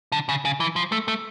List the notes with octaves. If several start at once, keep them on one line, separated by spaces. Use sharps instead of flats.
D3
C#3
C#3
E3
F3
A3
A3